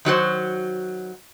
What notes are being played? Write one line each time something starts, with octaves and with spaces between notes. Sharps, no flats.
D#3 F#3 F#4 C5